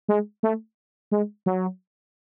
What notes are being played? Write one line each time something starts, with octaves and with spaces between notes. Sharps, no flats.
G#3
A3
G#3
F#3